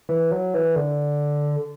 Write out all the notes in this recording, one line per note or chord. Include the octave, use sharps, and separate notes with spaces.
E3
F#3
E3
D3